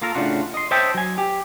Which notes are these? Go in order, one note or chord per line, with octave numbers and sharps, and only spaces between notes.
A#3 F4 A4 A#4
A2 C#3 D4 F4 F#4
D#5 C6
C5 C#5 D#5 E5 G5 A5
F#3 G#5
G4